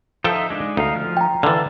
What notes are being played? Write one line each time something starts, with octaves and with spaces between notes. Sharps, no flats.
F3 D#4 A4 E5 G5
G#3 D4 D#4
D2 D#4 F5
F3 F6
G5 A#5
D3 E3 F5 A5